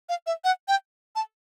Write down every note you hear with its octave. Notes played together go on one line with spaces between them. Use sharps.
F5
E5
F#5
G5
A5